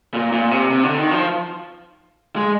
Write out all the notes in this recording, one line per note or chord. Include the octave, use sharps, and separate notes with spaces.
A#2
A#2
C3
C3
D3
D#3
F3
G#3